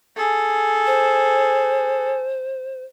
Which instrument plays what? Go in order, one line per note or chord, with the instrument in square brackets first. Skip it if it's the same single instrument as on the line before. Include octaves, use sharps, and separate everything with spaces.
[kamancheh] G#4 A4
[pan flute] C5